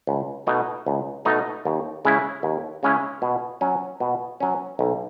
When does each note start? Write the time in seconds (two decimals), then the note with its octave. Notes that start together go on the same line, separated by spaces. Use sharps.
0.07 C#2
0.47 B2 A3 D#4
0.86 C#2
1.25 B2 A3 D#4
1.65 D#2
2.05 C#3 G#3 C#4 E4
2.43 D#2
2.83 C#3 G#3 C#4 E4
3.22 B2
3.61 F#3 C#4
4.00 B2
4.40 F#3 C#4
4.79 B1